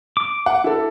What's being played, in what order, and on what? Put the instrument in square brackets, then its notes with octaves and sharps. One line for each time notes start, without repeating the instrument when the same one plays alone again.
[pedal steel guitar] D6
[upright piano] F#5
E4 A4